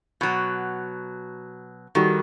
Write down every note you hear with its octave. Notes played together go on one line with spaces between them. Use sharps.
B2 F#3
D#3 G3 F#4 A4